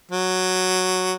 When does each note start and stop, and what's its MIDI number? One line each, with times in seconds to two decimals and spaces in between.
0.11 1.13 54